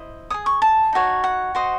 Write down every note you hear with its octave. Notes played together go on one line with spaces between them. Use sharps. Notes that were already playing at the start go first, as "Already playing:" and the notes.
Already playing: E4 C5 D#5
G#4 C#5 D#6
C#6
A5
D#4 F#4 C#5
F#5
F#4 C5 D#5